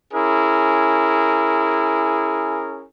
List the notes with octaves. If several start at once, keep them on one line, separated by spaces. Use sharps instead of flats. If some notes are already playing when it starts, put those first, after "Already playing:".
C#4 E4 G#4 A#4